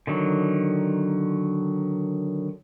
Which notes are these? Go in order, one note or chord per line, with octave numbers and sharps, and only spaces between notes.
D3 D#3 F#3